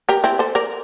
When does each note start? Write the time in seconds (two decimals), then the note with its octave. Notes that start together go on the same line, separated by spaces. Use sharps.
0.09 G4 A#4
0.24 C4 E4
0.39 A4 C5
0.55 A#4 D5